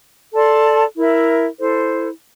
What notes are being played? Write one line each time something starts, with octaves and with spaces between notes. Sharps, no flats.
A4 D5 A5 C6
E4 A#4 E5
E4 A4 C5